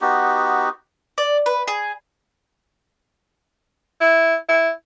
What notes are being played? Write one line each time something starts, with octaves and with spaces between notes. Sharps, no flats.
B3 D#4 F#4 G4
D5
B4
G#4
E4
E4